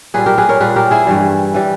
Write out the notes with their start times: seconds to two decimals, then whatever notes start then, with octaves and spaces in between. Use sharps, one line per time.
0.14 A#2 G3 G#4 B4
0.26 G4 A#4
0.38 G#4 B4
0.49 A#4 C#5
0.60 A#2 G3 G#4 B4
0.76 G4 A#4
0.91 E4 G#4
1.07 G2 E3 G3
1.54 E3 G3